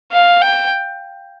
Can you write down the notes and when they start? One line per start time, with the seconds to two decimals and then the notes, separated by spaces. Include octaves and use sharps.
0.12 F5
0.42 G5